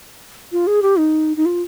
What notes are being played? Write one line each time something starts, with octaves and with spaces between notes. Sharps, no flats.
F4
G#4
G4
D#4
D#4
F4